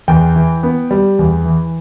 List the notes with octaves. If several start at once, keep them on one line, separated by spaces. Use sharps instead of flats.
E2 G5
E3
B3
G3
E2
E3